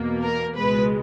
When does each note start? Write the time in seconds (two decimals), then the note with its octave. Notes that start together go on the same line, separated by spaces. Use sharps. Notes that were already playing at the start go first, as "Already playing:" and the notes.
Already playing: E2 B2 A#3
0.22 A#4
0.56 C#2 B2 G#3 B4